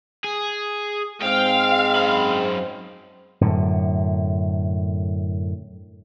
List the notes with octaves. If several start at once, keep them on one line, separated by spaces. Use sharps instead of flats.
G#4
G#2 G#3 C4 F5 G5
F#2 B5
F#2 A2 D3